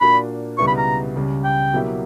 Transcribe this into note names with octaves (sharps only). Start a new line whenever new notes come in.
A#2 A#3 D4 F#4 B5
C#2 B2 G3 B3 E4 C#6
B5
A#5
C#2 C#3 G3
G5
B2 F#3 A#3 E4 G4